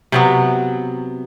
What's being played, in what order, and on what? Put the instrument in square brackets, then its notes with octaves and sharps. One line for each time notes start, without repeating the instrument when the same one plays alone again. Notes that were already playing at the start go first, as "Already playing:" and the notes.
[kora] C3 F#3 B3